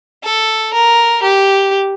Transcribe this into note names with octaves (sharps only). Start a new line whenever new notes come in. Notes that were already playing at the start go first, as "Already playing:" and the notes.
A4
A#4
G4